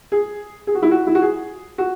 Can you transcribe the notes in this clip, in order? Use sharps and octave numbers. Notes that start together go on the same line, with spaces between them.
G#4
G#4
F#4
E4
F#4
E4
F#4
G#4
F#4